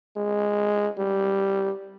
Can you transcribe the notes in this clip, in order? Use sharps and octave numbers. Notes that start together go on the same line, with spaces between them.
G#3
G3